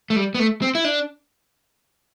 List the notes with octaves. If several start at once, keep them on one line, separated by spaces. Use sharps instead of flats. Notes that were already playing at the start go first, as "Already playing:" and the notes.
A3
G3
B3
A3
C4
E4
D4